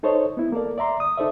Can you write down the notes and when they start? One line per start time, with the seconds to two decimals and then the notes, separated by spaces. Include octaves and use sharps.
0.03 D#4 A4 C5 C#5 D#5
0.37 B3 E4
0.52 A#3 A4 A#4 D5
0.78 D5 E5 A#5 C6
1.00 D#6
1.18 D#4 A4 C5 D5 E5